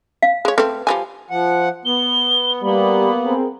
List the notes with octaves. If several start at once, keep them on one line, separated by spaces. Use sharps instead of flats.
F5
G#3 C#5
A3 C4 B4
F3 G3 G#5
F3 F#5
B3 G7
G3 A#3 B3 B5
C4 G#4 A#4